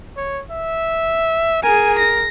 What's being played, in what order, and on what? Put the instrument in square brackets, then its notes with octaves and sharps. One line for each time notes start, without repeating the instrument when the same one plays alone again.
[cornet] C#5
E5
[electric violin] G#4 G#5 [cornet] A#4
[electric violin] A#6